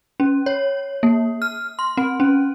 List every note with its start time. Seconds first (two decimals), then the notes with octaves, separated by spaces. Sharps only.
0.20 C#4
0.46 C#5
1.03 A#3
1.42 F6
1.79 C6
1.97 C4
2.20 C#4